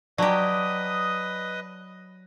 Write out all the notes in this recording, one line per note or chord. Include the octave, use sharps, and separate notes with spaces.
F#3 G4 B4 D5 D#5 A5 D#6